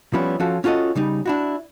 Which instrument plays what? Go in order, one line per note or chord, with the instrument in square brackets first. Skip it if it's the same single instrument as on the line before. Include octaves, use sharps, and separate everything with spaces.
[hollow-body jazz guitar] F3 G3 B3 C#4 E4
F3 C#4 F4 F#4 A4
C#4 F4 F#4 A4 D#5
C#3 G3 D#4
D4 E4 F#4